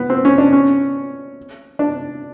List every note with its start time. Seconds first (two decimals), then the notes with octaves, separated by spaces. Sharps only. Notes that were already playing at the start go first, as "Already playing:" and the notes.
Already playing: B3
0.10 C4
0.25 C#4
0.38 D4
0.53 C#4
1.79 D4